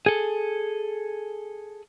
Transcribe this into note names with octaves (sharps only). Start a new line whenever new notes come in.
G#4 A4